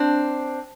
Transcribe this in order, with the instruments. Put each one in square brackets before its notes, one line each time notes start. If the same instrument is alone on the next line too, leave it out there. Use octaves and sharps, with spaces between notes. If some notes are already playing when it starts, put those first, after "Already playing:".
Already playing: [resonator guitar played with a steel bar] C4 D4